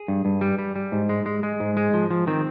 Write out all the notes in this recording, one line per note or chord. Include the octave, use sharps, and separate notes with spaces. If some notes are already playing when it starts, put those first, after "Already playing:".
Already playing: G#4
G2
G2
G3
G3
G3
G#2
G#3
G#3
G#3
G#2
G#3
F3
F3
D#3 C4